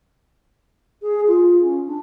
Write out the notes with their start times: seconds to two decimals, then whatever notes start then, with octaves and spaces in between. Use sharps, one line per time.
1.02 G#4
1.28 F4
1.61 C#4
1.87 D4